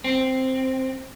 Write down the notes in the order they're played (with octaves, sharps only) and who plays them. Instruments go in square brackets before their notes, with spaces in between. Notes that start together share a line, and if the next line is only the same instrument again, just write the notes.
[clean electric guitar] C4